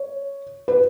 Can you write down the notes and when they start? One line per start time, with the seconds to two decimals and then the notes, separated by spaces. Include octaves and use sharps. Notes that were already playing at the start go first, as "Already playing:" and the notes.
Already playing: C#5
0.68 B4